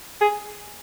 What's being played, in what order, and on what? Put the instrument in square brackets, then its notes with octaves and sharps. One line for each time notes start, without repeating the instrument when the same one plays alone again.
[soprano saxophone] G#4